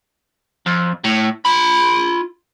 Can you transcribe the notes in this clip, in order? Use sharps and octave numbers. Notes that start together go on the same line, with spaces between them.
F2
A2
F4 B5